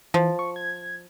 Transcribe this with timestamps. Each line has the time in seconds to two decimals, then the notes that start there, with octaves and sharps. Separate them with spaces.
0.14 E3 F3
0.39 C#6
0.56 G#6